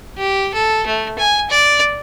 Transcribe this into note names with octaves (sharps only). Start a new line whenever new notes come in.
G4
A4
A3
G#5
D5